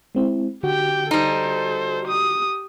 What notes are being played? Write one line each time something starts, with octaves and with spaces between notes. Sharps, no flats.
G#3 C4 E4
D3 F#4 G4 G5
G3 D#4 A4 C5
G4 D#6